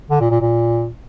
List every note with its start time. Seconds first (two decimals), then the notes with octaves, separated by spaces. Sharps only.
0.11 D3
0.21 A#2
0.31 A#2
0.41 A#2